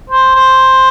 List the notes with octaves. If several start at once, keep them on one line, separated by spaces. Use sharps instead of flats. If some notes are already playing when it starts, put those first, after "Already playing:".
C5
C5